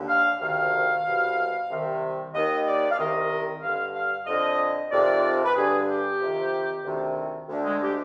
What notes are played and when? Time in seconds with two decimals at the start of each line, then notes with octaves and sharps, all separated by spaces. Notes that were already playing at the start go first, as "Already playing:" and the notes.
Already playing: D#2 D3
0.08 F5
0.40 D2 C3 D#3 F5
1.05 C2 B2
1.69 C2 C3 D#3
2.34 D#2 D#3 D#5
2.66 D5
2.91 F5
2.98 C2 C3 D#3 D#5
3.62 G2 D3 F5
3.95 F5
4.27 F2 D3 D#5
4.91 F2 C3 D#3 D5
5.44 B4
5.55 G2 D3 G#4
5.87 G4
6.20 F2 C3 D#3
6.84 D2 C3 D#3
7.48 D2 D3
7.64 G#3
7.81 G4